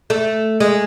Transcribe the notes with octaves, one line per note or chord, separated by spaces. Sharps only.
A3
G#3